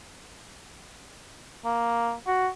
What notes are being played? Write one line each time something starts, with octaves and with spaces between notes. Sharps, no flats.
A#3
F#4